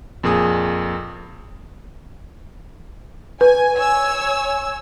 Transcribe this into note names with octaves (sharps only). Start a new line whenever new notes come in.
F2 A#2 G#4 D#6
B4 G#5
C#5 G#5 E6